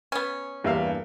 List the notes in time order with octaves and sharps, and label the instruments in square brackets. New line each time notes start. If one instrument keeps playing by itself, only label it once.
[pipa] B3 C#4
[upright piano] E2 E5 F5 [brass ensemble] G2 [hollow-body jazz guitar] A#3